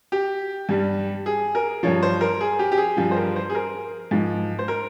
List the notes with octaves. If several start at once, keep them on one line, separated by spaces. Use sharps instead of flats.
G4
G2 G3
G#4
A#4
G2 F3 C#5
C5
A#4
G#4
G4
G4
G#4
G2 F3
C5
A#4
C5
G#4
A#4
G#2 F3
C5
A#4